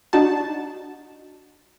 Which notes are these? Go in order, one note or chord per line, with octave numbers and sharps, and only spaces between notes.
D4 D#4 F#4 A5